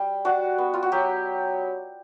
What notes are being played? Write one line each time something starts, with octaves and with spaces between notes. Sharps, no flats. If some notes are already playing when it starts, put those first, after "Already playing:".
Already playing: G3
D4 F#4
B3
F4
F#4
F#3 G4